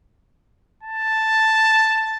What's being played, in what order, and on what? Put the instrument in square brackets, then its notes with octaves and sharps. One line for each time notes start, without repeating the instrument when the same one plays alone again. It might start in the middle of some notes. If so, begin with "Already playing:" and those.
[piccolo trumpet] A5